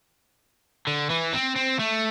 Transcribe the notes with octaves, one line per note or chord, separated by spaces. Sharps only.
D3
E3
C4
C4
A3